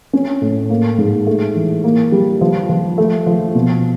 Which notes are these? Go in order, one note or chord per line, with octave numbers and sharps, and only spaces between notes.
C#4
A2
A#3
G#2
A3
E3
A#3
G3
F3
F3
A3
F3
B2